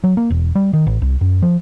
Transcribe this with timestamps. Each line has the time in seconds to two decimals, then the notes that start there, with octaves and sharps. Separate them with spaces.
0.04 F#3
0.17 A#3
0.30 E1
0.55 G3
0.73 D#3
0.87 A1
1.02 C2
1.21 F#2
1.42 F3